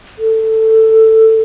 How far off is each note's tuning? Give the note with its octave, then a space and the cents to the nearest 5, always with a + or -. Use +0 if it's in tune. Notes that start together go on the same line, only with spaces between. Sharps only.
A4 +10